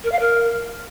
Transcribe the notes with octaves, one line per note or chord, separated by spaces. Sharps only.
A#4
F5
A#4